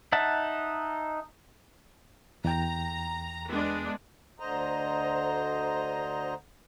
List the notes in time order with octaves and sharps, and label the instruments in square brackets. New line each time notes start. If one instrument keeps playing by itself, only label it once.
[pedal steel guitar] D#4 E5 F#5 A5
[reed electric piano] E2 G5 [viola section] A#5
[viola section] G#3 B3 D4
[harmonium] D2 D3 C5 D#5 A#5